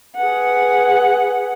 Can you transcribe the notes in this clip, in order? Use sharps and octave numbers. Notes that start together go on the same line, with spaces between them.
G#4 B4 F#5